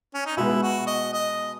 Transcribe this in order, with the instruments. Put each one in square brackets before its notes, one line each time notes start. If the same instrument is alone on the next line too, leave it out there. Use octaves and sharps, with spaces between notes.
[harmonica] C#4
D#4
[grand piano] B2 G#3 B3 [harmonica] E4
[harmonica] F#4
D#5
D#5